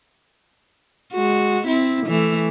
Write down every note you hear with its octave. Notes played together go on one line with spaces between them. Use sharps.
G#3 F#4
C4 E4
E3 A3